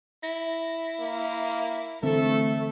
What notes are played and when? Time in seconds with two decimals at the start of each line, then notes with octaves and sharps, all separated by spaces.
0.23 E4 A#6
1.00 A#3
2.03 D3 E3 A3 C4 A4 E5